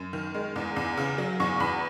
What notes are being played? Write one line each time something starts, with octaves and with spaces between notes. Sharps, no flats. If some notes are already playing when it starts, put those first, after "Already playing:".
Already playing: F#2
D#3
G#3
E2
E2
C#3
F#3
E2 C#6
E2 B5